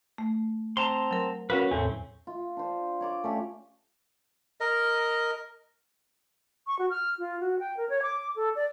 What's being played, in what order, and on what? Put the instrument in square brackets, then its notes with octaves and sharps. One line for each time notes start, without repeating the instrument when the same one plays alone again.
[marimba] A3
[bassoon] C4 [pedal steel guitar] A5 A#5 C6
[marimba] F#3 A#4
[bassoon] A#3 [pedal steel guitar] C#4 F#4 B4
[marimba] E2 A2 [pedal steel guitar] C#3 C4 C#4 [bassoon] A3
[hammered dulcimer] F4
D4 C5
C#5 D5 D6
A3 C#4 G4
[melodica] A#4 D#5
[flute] C#6
F#4
F6
F4
F#4
G5
A#4
C#5
D6
A4
D5